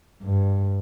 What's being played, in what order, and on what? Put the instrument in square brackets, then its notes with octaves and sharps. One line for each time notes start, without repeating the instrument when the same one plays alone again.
[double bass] G2